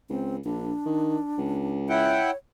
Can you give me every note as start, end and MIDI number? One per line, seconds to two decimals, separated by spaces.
0.10 0.39 37
0.10 0.36 60
0.45 0.72 34
0.45 1.77 62
0.85 1.17 51
1.38 2.21 37
1.89 2.31 64
1.89 2.37 73
1.89 2.31 78
1.89 2.31 79